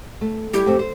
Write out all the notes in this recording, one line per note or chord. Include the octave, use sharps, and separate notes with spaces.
A3
G3 E4 G4
F2 A3 C4
C5